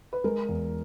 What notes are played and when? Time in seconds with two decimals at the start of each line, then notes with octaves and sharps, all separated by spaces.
0.13 B4
0.24 G#3 A#4
0.49 E2